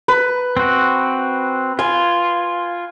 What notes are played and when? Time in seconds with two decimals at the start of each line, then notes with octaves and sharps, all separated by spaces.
0.08 B4
0.57 C4 F#4
1.79 F4 G#5